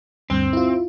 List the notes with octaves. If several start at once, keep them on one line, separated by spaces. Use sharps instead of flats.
D2 G2 C4
E4 F4